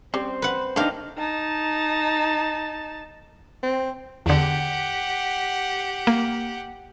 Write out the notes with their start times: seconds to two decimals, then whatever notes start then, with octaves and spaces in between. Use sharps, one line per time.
0.14 G3 C4 C#4 C5
0.42 B4 F#5
0.76 A3 A#3 D4 D#4 G4 F5
1.17 D#4 A5
3.63 C4
4.26 E2 D3 G4 F#5
6.07 A#3